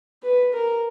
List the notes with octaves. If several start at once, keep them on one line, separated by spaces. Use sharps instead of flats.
B4
A#4